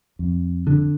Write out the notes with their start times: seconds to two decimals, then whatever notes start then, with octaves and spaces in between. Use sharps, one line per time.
0.19 F2
0.67 D3